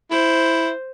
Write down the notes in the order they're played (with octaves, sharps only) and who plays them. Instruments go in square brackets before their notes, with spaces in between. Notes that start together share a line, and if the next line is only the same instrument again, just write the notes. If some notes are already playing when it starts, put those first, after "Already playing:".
[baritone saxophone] E4 [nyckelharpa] C5